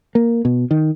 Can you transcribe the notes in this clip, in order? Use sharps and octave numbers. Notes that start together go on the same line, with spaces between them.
A#3
B2
D#3